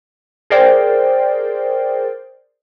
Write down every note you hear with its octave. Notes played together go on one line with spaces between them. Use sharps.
G#4 A#4 C5 D5 G5